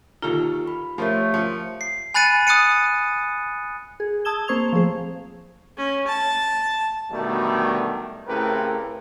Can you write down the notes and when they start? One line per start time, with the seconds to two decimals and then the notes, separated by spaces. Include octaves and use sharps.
0.22 D#2 D#4 F4 G4 A4 A#5
0.67 B5
0.98 F3 A3 G4 A#4 C#5
1.34 F3 C#7
1.81 C7
2.14 G#5 B5 F#6 A6 C#7 D#7
2.47 D#6 F#6 A6 C#7 D#7
4.00 G#4
4.25 A5 D#6 E6 G#6 E7 G7
4.48 A#3 C4 C5 C#6 G#6 F7
4.73 F3 A3 G#4 C5
5.77 C#4
6.07 A5
7.11 B2 D3 D#3 F#3 G3 A3
8.27 A2 C#3 C4 G4 A#4 B4